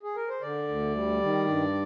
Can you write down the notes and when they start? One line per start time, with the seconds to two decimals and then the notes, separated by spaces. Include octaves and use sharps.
0.03 G#4
0.16 A#4
0.29 C5
0.42 D3 D5
0.69 D2
0.95 G3
1.22 D#3
1.48 G2